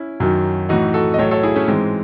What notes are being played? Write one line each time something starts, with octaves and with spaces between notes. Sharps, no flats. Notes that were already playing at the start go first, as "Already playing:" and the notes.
Already playing: C#4 E4
F#2 D#3 F#3
A2 E3 D#4 F#4
F#4 A4
D#5
A2 F#3 A4 C#5
A4 C#5
E4 G#4
A3 C#4
G#2 E3 G#3 C4